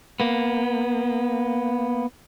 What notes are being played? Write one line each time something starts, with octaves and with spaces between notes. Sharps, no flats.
A#3 B3